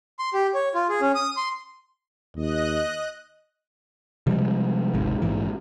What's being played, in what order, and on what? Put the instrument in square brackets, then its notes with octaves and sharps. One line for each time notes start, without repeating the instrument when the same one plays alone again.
[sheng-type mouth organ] C6
G4
C#5
F4
G#4
C#4
D#6
C6
[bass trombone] D#2 [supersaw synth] D#5 F#6
[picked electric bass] C3 F3 G3 G#3
D1 G#1 G#2 C3
A#1 G#2 E3